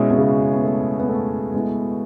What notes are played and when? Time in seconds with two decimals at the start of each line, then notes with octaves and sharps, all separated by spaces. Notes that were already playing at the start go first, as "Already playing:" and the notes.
Already playing: B2 G#3 C#4 E4 G#4
0.10 B2
0.18 C#3
0.53 B3
0.64 A3
1.00 B3
1.09 A3
1.54 G#3 B3 E4